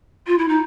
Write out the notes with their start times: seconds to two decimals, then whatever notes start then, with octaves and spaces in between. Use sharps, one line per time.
0.27 F4
0.38 E4
0.48 D#4